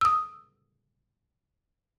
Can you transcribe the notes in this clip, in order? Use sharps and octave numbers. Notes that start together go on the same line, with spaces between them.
D#6 E6